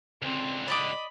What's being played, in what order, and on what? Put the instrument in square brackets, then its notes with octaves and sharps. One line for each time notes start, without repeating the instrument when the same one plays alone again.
[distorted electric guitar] C#2 D3 [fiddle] C4
[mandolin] D5 D#5 D6 [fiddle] B5